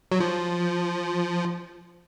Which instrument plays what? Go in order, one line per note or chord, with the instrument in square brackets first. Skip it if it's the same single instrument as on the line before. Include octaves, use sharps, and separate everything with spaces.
[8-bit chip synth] F#3
F3